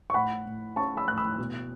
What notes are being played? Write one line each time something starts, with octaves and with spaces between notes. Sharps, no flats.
C#6
A2 F#5 B5
A2
C#4 A5 C#6
B5 E6
A2 F#6
B5 E6
B2